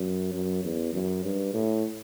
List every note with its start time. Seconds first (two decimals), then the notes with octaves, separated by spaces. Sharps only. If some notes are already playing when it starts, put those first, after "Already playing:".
Already playing: F#2
0.33 F#2
0.64 E2
0.94 F#2
1.24 G2
1.54 A2